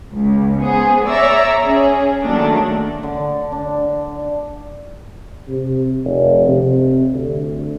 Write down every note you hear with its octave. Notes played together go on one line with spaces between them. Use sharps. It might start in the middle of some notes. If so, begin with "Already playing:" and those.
C#2
B3 G#4 C5
C#5 D5 E5 A#5 E6
C#4 G#4
D#3 F#3 A3 A#3 D4
D3
D4
C3
F1
C3
D2